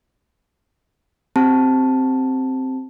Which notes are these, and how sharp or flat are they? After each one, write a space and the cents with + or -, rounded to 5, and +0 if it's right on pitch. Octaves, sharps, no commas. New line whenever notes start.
C4 +0 G4 +0 A5 +0